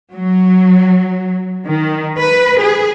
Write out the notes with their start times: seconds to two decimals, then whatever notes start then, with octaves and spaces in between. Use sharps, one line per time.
0.14 F#3
1.66 D#3
2.19 B4
2.60 G#4